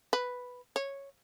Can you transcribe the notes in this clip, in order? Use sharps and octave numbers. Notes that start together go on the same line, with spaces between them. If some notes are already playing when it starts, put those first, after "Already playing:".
B4
C#5